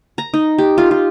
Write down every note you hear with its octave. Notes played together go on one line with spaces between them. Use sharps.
A#5
D#4
G4
F4
F4